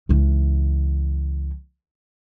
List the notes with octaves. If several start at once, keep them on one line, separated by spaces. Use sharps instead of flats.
C#2 E3